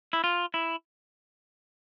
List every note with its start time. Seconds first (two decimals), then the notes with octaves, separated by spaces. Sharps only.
0.13 E4
0.24 F4
0.54 E4